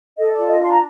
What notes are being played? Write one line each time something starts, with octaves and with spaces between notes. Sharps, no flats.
A4 D#5
F4 D5
D#5
D4 C6
A#5